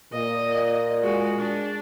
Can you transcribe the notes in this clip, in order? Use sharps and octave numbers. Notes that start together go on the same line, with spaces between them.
A#2 D#5
G#3 F#4
D4